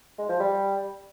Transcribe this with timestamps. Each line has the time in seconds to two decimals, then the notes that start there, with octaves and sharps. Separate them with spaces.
0.18 G#3
0.29 F3
0.40 G3